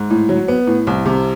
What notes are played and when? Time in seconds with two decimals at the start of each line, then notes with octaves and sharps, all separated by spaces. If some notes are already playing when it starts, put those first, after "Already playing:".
Already playing: G#2
0.10 A2
0.29 F#3
0.48 B3
0.67 A2
0.87 C2
1.05 C3